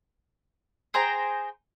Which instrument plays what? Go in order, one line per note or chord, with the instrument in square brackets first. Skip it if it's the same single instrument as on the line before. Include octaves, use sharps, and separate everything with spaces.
[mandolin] G#4 C5 G5 A#5